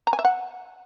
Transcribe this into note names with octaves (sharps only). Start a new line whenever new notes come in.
A#5
G#5
E5
F#5